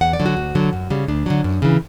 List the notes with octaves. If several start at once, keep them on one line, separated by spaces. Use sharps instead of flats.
E2 F#5
D5
D3 F#3
F#4
D2
D3 F#3
F#2
C#3 G3
D2 D4
D3 F#3
F#2
C#3 E3